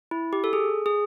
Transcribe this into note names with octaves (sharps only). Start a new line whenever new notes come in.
E4
G4
A4
G#4
G#4